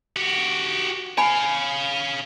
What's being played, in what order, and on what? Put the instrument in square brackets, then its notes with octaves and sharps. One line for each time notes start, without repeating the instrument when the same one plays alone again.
[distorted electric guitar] F#4 G4
[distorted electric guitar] C#5 F5 [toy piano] G#5 B5